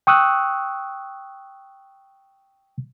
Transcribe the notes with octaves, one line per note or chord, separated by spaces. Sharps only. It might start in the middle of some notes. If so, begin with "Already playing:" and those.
G5 C#6 D#6 E6 F#6